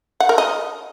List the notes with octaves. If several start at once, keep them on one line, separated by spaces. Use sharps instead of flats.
F#5
A#4
D#5